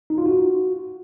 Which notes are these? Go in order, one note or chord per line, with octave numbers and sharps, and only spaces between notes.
D#4
F4
F#4